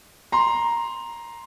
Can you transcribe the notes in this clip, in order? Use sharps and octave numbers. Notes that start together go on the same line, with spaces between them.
A#5 C6